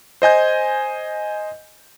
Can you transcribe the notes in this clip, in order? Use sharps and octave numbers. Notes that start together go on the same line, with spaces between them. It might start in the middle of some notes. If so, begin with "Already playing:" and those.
C5 D#5 G#5 G6